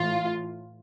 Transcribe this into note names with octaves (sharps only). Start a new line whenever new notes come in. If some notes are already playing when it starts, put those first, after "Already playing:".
Already playing: A2 E3 F4